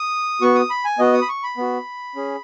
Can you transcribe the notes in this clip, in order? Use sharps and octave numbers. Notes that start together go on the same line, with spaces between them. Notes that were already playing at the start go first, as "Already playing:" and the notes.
Already playing: D#6
B3 F#4 C#6
D#6
B5
G#5
B3 F#4 D#5
D#6
B5
C#6
B5
B3 F#4
C#4 G#4